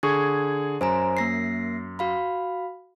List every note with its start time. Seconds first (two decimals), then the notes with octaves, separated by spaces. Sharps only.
0.03 D3 G#4 C#6 G#6
0.81 F#2 C5 G#5 A#5
1.17 A#3 A#6 C7
1.99 F#4 F5 B5